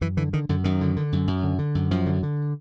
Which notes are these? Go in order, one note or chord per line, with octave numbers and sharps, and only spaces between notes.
F#2 E3
D3 E3
D3 D#3
F#2 D3
F#2 D#3
D3
D3
F#2
F#2
D3
D3
F#2
F#2 F3
D3
D3